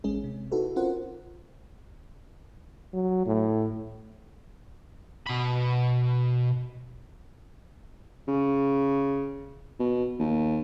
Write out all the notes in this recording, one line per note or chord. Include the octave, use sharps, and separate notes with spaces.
A1 G#3 C#4 G#4
C3
D#4 E4 F#4 A4 B4
C4 C#4 F4 A#4 C5 F#5
F#3
A2
B2 B5
C#3
B2
D#2